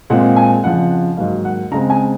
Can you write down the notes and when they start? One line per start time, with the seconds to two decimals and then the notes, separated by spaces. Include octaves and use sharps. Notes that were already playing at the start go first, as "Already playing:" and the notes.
0.10 A#2 G#3 C4 F#5
0.36 G#5
0.64 F2 C#3 F3 F#5
0.91 F#5
1.17 G#2 D#3 F#3 A#3 F5
1.45 F#5
1.71 C#3 G#3 C4 A#5
1.90 G#5